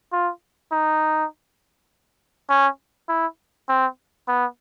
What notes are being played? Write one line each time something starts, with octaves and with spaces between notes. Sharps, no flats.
F4
D#4
C#4
E4
C4
B3